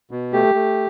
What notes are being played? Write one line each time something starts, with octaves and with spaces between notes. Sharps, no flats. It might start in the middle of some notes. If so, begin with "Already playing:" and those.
B2
A3 G4
A3